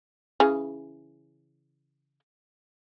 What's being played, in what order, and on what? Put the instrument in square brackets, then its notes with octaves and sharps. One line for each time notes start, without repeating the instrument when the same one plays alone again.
[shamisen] C#3 E3 G#4